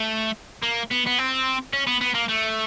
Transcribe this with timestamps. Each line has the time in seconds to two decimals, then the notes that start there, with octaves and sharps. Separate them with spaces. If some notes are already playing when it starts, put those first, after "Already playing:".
Already playing: A3
0.63 A#3
0.91 B3
1.07 B3
1.19 C4
1.73 C#4
1.87 B3
2.01 B3
2.14 A#3
2.28 A3